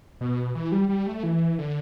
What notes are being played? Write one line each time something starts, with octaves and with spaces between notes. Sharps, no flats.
B2
E3
G3
G3
A3
E3
D3